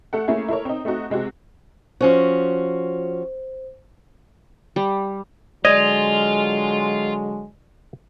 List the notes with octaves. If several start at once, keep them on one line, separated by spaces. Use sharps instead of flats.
A3 A4 F#5
A3 A#3 C#4 E4 G#4
E4 A4 A#4 C#5
C4 D#4
A3 C4 D#4 F#4
C3 G#3 C4 F#4
F3 C#4 F#4 C5
G3
D3 F#3 G#3 F4 D5 D#5